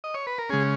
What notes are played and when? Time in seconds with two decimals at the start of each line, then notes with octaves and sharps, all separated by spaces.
0.04 D#5
0.14 C#5
0.27 B4
0.38 A#4
0.50 C#3 G#3 C#4 G#4